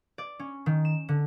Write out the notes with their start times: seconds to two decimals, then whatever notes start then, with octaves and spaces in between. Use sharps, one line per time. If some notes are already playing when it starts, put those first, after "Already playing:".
0.18 D5
0.39 C#4
0.66 D#3
0.85 E7
1.09 D3